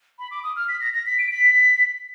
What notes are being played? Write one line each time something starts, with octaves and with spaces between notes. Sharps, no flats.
B5
D6
D#6
F6
B6
A#6
A#6
B6
D7
B6